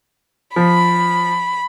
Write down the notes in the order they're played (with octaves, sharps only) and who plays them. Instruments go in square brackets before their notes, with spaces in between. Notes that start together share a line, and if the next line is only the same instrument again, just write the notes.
[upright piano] F3 [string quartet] B5